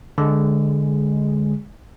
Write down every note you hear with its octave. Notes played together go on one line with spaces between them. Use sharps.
D3 G#3